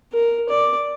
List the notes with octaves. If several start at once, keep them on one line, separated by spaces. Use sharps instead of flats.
A#4
D5